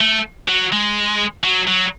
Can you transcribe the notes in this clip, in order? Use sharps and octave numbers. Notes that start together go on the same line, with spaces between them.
A3
F#3
G#3
F#3
F#3